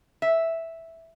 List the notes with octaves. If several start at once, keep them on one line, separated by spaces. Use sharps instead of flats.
E5